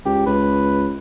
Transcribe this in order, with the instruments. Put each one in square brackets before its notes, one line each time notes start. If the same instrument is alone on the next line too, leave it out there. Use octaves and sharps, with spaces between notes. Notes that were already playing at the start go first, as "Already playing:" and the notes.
[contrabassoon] C#2 [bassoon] G4
[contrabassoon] C#2 [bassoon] B4